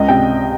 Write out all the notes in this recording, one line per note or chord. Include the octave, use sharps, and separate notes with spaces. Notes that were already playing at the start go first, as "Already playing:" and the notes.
Already playing: C#2 D#5
C3 G5